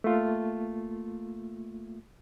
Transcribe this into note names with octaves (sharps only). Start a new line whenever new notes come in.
A3 A#3 F4